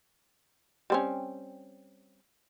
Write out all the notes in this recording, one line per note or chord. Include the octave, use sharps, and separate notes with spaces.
G3 C4 C#4